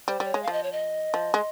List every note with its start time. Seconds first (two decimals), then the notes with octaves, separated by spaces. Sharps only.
0.08 G3 C5
0.20 G3 C#5
0.34 G#3
0.43 F3 F5
0.53 D#5
0.63 C#5
0.72 D#5
1.14 F3
1.34 G#3